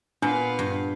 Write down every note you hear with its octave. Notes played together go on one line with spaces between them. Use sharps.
A#2 B3 D4 F5
G2